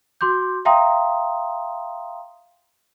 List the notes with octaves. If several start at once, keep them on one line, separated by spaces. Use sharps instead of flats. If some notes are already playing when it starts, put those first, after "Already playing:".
F#4 C6 D6 G6
E5 F5 G5 A#5 C6 D#6